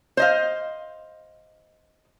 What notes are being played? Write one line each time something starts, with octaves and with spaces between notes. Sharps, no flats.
C5 D#5 F5